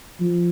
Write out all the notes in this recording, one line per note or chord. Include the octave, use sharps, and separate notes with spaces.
F3